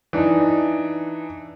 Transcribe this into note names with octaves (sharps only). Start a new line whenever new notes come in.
E3 D4 D#4